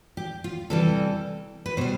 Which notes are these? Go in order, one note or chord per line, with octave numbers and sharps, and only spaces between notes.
G4
F4
C3 E3 G3 A4
B4
B2 G3 C5